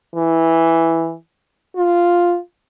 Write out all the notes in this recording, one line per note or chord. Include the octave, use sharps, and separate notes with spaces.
E3
F4